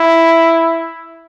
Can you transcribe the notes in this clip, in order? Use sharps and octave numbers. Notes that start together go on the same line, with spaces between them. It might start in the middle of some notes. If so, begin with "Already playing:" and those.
Already playing: E4